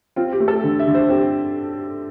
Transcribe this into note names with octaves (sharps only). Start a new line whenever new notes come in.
C4 F4
G4
A3
A4
D3
E5
D3
C5
C4 G4